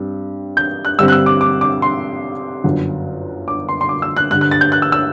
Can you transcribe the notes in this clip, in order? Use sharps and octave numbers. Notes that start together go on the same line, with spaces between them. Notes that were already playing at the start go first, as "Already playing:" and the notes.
Already playing: G2 G3 C4
G6
F#6
G2 D3 G3 C4 E6
F#6
E6
D6
D6
D6
C6
G1 F#2 F#3
D6
C6
C6
D6
E6
F#6
G2 D3 G3 F#6
F#6
A6
G6
F#6
E6
E6